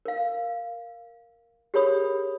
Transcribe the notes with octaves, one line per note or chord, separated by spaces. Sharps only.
A#4 F5
G4 G#4 A#4 C#5 B5 D#6